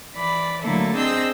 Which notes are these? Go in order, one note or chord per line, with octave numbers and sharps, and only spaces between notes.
E3 D5 B5
D3 F#3 A3 A#3 E4 A4
C4 D4 G#4 D#5 E6 G6